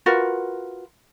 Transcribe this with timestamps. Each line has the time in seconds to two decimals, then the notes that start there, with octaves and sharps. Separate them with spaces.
0.06 F4 F#4 A#4 B4